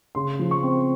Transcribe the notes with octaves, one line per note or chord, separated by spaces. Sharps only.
C#3 C6
F3
C#6
C4